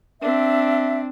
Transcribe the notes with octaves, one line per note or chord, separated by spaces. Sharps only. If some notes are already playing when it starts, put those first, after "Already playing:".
C4 D4 E5